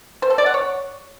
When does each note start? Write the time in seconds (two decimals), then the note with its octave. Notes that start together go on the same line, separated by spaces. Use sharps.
0.22 C5
0.30 A4
0.38 D5
0.46 F#5
0.54 C#5